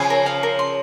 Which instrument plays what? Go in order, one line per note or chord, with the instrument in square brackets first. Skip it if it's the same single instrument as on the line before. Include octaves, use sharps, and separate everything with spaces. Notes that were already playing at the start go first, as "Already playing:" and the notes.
Already playing: [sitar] C#3 F3 [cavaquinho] G#5
[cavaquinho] A#4
F5
A#4
C6